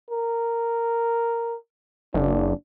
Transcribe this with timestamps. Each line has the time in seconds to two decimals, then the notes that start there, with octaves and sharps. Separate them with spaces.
0.11 A#4
2.14 F#1 D4